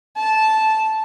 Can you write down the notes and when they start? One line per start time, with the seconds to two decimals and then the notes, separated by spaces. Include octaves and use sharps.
0.17 A5